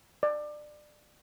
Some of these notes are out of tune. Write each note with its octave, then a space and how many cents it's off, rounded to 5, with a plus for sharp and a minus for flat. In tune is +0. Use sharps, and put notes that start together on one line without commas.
D5 +25